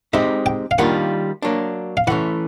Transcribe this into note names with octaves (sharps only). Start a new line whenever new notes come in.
G#3 C4 D#4 G4 E5
G5
F5
D#3 G3 A#3 D4 F4 F#5
F#3 A#3 D4
F5
E3 A3 C#4 F#5